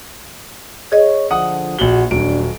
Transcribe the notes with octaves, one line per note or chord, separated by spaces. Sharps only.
G#4 C#5 D#5
D3 F3 F4 F#5 D#6
A#1 F#4 F#7 G7
D#1 F#3 D4 D7